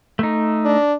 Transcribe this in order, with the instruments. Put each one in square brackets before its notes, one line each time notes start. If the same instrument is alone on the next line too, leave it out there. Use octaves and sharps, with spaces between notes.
[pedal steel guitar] A3 D#4
[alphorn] D4